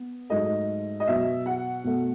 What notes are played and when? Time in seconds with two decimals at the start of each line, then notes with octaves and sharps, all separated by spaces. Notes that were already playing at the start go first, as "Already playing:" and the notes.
Already playing: B3
0.30 G#2 F#3 A3 D#5
1.00 D#5
1.07 B2 F#3 B3 E5
1.46 F#5
1.84 B2 A3